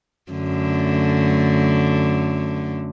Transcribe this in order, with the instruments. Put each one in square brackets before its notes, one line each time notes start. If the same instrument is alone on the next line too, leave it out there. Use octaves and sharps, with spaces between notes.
[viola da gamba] F#2 D3 A3